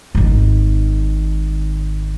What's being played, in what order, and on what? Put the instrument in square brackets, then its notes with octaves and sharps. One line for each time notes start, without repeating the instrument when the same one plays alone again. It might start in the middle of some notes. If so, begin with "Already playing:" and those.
[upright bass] G#1 D#3